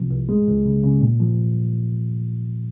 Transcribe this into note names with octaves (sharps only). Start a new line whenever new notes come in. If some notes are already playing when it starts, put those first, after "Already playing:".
Already playing: C2 C3 F3
C2
G#3
C#2
C#3
C#3
A#2
F3